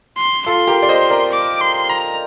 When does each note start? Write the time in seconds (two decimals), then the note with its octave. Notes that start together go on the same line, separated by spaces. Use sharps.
0.17 C6
0.46 F4 A4 C6
0.67 G4 A#4
0.83 D5
0.89 C5 D#5
1.10 A#4 D5
1.32 D6
1.61 C6
1.89 A#5